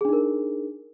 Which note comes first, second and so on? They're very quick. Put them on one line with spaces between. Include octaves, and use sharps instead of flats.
G#4 D4 D#4 A#4